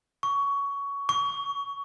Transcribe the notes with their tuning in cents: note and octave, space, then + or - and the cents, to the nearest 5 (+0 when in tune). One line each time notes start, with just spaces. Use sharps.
C#6 +20
C#6 +35